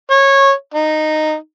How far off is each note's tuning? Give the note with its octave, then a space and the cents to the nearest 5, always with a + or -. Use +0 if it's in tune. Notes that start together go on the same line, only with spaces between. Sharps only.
C#5 -15
D#4 -10